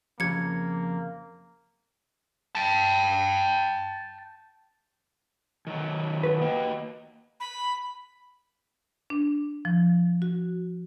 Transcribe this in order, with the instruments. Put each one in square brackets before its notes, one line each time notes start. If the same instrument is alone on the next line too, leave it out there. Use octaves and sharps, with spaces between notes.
[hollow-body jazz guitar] F2 C#3 [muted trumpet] A#3 [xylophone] G#6 C#7
[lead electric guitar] G5 A5
[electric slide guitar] D#3 F#3
[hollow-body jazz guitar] F#4 B4
[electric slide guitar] A#3 D#5 G5
[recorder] B5
[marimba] D4
F3
F#4